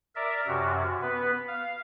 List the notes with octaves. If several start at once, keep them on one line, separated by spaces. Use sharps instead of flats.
A#4 D5 E5
F#2 C3 F#4
B3 B4
F5